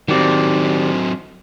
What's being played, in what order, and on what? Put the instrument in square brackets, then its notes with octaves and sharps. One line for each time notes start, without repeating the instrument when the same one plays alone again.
[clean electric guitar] D#3 G4 D5 [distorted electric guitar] F#3 C4